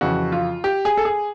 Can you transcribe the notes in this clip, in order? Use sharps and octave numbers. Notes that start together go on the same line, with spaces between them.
F2 C#3 E3 F#4
F4
G4
G#4
A4
G#4